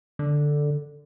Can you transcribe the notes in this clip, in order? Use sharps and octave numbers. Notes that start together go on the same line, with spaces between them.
D3